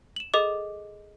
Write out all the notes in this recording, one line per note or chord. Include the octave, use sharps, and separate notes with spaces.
E7 F#7
G#4 A4 D#5 D6